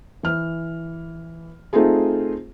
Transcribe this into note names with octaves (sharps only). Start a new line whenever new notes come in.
E3 F6
A3 C4 D#4 F4 G#4